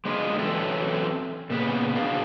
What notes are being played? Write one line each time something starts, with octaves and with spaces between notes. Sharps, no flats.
G#3 D4 E4 F4 G#4 D#5
E3 F#3 C4 C#4 A4 E5
A#2 C#3 B3 B4
D4 F#4 G#4 D5 F5